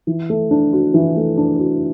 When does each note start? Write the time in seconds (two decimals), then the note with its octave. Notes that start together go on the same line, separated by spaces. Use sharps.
0.07 E3
0.30 A3
0.51 D4
0.73 F#4
0.94 E3
1.17 A3
1.37 D4
1.60 F#4